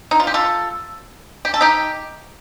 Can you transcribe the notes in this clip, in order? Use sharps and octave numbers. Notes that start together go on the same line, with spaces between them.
D#4
F4
G4
F4 A4
G4
A4
D#4 G4